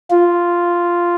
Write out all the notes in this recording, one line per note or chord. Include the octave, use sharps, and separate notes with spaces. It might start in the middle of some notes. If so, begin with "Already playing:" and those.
F4